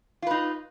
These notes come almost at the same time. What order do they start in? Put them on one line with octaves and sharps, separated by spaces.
F4 B4 D#4